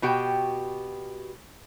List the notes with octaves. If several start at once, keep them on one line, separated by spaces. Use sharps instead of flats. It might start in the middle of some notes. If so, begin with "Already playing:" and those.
B2 F#4 G4 G5